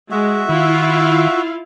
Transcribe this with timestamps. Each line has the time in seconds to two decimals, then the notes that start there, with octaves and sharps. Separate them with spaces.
0.11 G#3 F#4 E5
0.49 D#3 E4 F4 F5